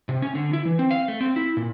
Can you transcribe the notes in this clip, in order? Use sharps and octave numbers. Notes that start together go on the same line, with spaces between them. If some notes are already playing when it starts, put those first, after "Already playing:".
C3
C#4
D3
E4
E3
C4
F5
A3
C4
E4
A#2